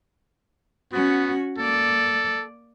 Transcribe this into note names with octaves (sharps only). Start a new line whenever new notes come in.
B3 C#4 F#4
A#3 A4 D5